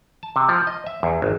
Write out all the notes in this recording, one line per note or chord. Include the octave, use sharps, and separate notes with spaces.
A5
C3
F3
D#5
E5
E2
G#1